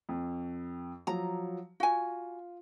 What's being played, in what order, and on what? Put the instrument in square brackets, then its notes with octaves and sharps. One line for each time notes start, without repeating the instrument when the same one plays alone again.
[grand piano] F2
[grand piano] F3 F#3 [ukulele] A#5
[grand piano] F4 [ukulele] F#4 G#5